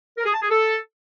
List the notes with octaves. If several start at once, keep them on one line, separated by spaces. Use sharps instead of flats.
A#4
G#4
A5
G#4
A4